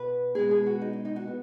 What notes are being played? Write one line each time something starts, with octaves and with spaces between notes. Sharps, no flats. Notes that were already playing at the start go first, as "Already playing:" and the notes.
Already playing: B2 B3 B4
B2 G#3 B3 G#4
G#4
F#4
D#4
D#4
D#4
F#4
B3